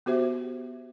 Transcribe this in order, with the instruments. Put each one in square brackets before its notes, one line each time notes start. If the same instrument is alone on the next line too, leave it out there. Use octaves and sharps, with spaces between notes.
[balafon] B3 F#4 G4 C5 E5